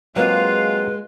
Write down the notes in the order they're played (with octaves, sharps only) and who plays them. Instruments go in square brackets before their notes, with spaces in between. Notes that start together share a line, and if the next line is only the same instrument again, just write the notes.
[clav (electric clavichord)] F#3 A#3 C4 [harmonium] G#3 [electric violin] F4 F5 [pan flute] B4